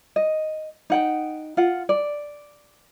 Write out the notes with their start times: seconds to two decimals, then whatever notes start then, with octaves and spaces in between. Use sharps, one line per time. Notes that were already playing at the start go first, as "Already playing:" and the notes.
0.16 D#5
0.90 D#4 F#5 G5
1.57 F4 F#5
1.89 D5